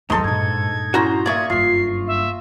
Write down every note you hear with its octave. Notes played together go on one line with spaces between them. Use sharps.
D#2 G#2 F#3 D#4 A4 C6
G2 A#2 G#6
C#4 E4 F#4 C5 A#5
A#3 D5 E5 C#6 D#6 G#6
F#1 G2 F4 C7
E5